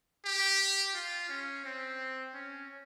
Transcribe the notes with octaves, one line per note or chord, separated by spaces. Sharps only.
G4
F4
C#4
C4
C#4